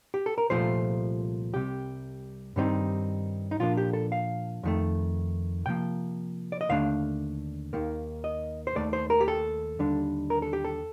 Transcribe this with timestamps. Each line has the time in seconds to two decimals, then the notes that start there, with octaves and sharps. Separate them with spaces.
0.14 G4
0.26 A4
0.38 A#4
0.50 C2 A#2 F3 A3 C5
1.53 C2 C3 G3 G4
2.56 G2 D#3 G3 C4 D#4
3.51 D#4
3.59 A#2 F3 A#3 D4 F4
3.77 G4
3.93 A4
4.12 F5
4.63 F2 D#3 A3
5.66 C3 F3 A#3 G5
6.52 D5
6.61 D#5
6.69 D#2 D3 A3 D4 F5
7.73 D#2 D#3 A#3
8.24 D#5
8.67 C5
8.76 D#2 D#3 A3 D5
8.93 C5
9.10 A#4
9.21 G4
9.28 A4
9.79 D#2 D3 G3 D4
10.30 A#4
10.42 A4
10.53 G4
10.65 A4